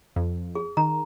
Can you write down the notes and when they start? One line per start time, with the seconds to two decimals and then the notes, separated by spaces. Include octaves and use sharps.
0.16 F2
0.55 G#4
0.77 D#3 A#5